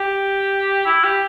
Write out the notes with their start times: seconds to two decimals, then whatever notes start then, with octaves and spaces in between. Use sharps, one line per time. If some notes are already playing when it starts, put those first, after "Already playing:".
Already playing: G4
0.86 E4
1.04 G4